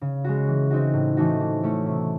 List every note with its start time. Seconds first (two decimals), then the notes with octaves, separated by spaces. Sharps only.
0.01 C#3
0.24 G#3 C#4 F#4
0.48 E3
0.70 C4 D#4 F#4
0.93 A2
1.17 E3 A3 D#4 F#4
1.40 E3
1.63 A3 C#4 E4
1.86 C3